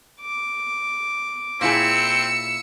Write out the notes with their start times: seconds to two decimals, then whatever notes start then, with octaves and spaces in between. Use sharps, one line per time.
0.21 D6
1.61 A#2 C4 E4 G#4 E6 C#7